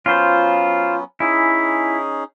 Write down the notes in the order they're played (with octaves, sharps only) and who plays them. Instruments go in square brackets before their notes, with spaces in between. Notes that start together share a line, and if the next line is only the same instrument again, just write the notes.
[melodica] F#3 B3 C#4 [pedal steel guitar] F4 C5
[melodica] C#4 D#4 G#4 [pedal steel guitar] E4